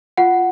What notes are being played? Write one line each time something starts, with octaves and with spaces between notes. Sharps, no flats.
F4 F#5